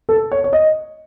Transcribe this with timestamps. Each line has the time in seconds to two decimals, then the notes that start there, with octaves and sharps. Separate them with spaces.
0.09 A4
0.32 C#5
0.44 C#5
0.53 D#5